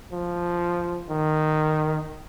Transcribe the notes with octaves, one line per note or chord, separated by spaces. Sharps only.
F3
D#3